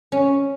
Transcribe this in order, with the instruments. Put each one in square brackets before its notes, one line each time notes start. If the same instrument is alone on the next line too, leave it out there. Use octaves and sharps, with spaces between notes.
[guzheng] C#4